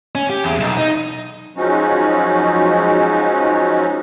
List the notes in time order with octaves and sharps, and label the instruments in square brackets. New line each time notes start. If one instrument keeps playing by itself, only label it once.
[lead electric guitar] C#4
G4
E2
B1
D#4
[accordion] F3 F#3 G#3 C#4 D#4 F#4